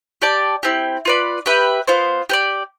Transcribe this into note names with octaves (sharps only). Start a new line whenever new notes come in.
G4 D5 A5
C4 E4 G4
F4 B4 D5
G4 B4 E5
B3 F4 C5
G4 B4 D5